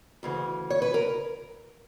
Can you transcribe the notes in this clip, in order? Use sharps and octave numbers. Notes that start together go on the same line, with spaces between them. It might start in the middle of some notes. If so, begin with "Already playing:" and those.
D2 C#3 E3
C#5
B4
A#4